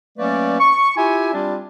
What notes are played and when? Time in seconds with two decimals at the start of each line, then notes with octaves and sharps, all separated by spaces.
0.18 F#3 A3 A#3 C#4 B4 D5
0.59 C#6
0.96 E4 F4 G4 E5 G#5
1.33 G3 C4 D4 F4 G4 D5